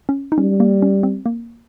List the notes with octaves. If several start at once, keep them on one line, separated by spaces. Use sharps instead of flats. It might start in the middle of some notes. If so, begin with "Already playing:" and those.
C#4
D#4
G3 C#4
A#3
C#4
C4
A#3